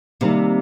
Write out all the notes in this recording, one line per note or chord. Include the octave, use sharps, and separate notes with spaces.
C3 D#3 G3 A#3